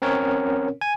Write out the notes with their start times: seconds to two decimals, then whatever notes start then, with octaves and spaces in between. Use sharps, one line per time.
0.02 C4 C#4 A#4 C#5
0.81 G#5